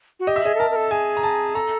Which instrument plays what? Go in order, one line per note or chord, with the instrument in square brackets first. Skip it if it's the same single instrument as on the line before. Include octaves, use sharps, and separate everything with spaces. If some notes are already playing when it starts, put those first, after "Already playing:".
[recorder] F#4
[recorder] G4 [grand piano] D#5
[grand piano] E5
[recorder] G#4 [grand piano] D#5
[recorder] A4
[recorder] A#4 [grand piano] A5
[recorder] A#4
A4
[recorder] G#4 [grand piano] G#5
[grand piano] A#5
A5
[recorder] A4 [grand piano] A#5